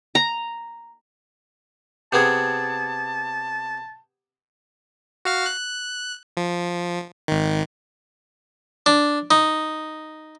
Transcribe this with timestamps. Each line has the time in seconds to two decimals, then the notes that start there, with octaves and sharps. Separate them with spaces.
0.15 A#5
2.13 C3 B3 G#4 A5 G6 G#6
5.25 F#4 F5 F6
5.46 F#6
6.37 F3
7.28 G#1 D#3
8.86 D4
9.31 D#4